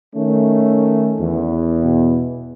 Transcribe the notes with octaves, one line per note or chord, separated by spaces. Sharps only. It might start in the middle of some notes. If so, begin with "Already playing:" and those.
D#3 A3 C#4
E2
B2